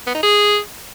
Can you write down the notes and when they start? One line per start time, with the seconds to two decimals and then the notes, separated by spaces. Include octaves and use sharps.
0.07 B3
0.15 D#4
0.23 G#4